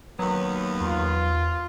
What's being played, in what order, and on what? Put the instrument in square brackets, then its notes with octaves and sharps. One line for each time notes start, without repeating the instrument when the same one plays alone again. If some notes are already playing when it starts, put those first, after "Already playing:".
[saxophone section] D#2 B3 [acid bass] F#3
[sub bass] E2 [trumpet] F4